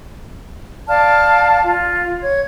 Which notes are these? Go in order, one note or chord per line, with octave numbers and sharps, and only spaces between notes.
D5 F5 A5 F6
F4
C#5 G#6